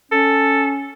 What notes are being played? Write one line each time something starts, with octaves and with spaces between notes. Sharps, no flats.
C#4 A4